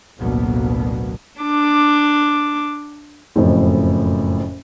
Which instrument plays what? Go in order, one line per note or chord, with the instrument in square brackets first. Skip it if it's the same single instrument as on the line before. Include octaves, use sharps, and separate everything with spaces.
[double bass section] A1 D2 B2 F#3 A#3 B3
[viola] D4 D6
[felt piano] F#1 F2 A2